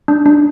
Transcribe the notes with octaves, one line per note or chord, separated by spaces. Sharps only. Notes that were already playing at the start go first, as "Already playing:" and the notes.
D4
D4